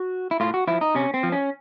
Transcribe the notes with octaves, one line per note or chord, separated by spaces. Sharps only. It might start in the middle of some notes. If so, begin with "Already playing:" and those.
Already playing: F#4
E4
A2 F4
F#4
F3 E4
D#4
C3 C#4
C4
F3
C#4